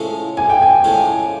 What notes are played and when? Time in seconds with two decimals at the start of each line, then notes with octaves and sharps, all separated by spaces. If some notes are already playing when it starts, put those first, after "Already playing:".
Already playing: A2 F3 G#3 C#4
0.37 B1 G#5
0.50 G5
0.62 G#5
0.84 A2 F3 G#3 C#4